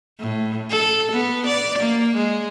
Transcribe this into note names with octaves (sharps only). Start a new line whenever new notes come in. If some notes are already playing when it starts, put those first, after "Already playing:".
A2
A4
B3
D5
A#3
G#3